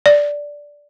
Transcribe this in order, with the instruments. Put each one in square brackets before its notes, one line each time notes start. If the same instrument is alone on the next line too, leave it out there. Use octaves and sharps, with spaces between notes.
[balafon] D5